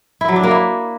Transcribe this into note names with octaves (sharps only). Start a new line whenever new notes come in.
E4
F#3
D4
A#3
E4